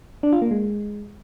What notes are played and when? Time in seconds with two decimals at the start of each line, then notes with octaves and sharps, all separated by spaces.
0.23 D4
0.32 F4
0.42 A#3
0.51 G#3